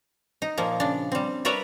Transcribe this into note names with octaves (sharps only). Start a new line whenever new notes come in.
D#4
A#2 F3 A#3
C#3 D4
G3 C4
A#4 B4 C#5 D5 E5 A#5